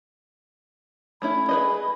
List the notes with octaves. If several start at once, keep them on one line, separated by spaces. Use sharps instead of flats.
A3 C#4 E4 B5
G#4 B4 D#5